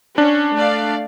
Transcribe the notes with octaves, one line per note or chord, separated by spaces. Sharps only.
C#4 D4
A3 D5 F5